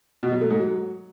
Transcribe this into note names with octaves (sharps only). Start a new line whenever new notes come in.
B2
F#3
A3
G#2
F#3